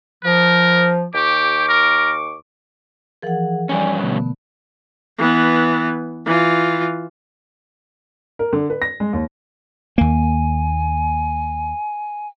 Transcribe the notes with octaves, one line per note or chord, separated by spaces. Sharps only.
F3 A#4
D#2 G4 C#6 D6
A#4
E3 F3 G#4 A#4 F#5
G2 G3 C#4 D5 G#5
B2 D3 A3 B3
E3 B3
E3 F4
A#4
D3
B4
A#6
G#3
D#2
D#2 A#3 G#5